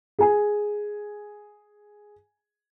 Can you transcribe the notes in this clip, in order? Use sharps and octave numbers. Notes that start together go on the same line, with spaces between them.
G#4 G#5